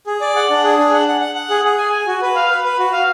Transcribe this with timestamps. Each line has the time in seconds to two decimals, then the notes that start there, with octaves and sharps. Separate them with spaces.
0.07 G#4
0.21 D5
0.36 F#5
0.50 D4
0.64 G#4
0.79 D4
0.93 F#5
1.08 F#5
1.21 F#5
1.36 F#5
1.50 G#4
1.65 G#4
1.78 G#5
1.92 G#5
2.07 F#4
2.22 B4
2.36 F5
2.50 B4
2.64 B4
2.79 F#4
2.93 F5